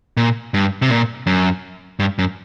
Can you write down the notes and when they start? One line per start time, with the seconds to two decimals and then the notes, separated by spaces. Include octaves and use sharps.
0.17 A#2
0.54 G2
0.82 C3
0.90 A#2
1.27 F#2
2.00 G2
2.19 F#2